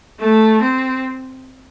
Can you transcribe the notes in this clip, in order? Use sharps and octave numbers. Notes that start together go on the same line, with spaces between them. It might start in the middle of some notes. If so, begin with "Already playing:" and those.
A3
C4